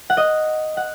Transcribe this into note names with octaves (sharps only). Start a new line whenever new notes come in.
F#5
D#5
F#5